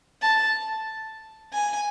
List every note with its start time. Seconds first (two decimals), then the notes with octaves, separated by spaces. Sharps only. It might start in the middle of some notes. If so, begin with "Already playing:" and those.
0.22 A5
1.53 G#5